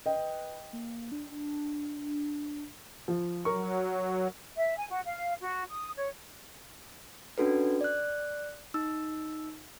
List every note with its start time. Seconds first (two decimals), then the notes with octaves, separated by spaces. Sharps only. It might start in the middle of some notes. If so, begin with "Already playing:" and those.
0.06 B4 D#5 G5
0.73 A#3
1.12 D4
3.08 F3
3.45 F#3 A#4 C#6
4.56 E5
4.77 G#5
4.89 F#4
5.05 F5
5.42 F#4
5.70 D#6
5.97 C#5
7.38 C#4 D4 F#4 A4 B4
7.81 D5 F#6
8.74 D#4 E6